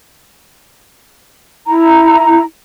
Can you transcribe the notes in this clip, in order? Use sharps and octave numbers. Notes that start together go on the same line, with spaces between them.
E4 A#5